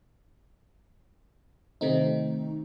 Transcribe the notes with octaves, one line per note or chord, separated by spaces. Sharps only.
C3 D#3 A3 C4 D#4